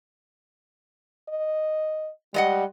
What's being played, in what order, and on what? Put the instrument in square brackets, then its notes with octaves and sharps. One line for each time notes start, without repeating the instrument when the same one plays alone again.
[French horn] D#5
[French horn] G3 [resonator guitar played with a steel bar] G#3 D#5 F#5